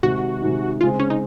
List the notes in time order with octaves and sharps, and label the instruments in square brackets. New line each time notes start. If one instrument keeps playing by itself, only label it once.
[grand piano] C3 D#3 G#3 D#4 [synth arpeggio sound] F#4
[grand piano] C3 D#3 G#3 D#4
[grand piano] C#3 G#3 C4 [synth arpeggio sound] F4
[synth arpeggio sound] C#4
D#4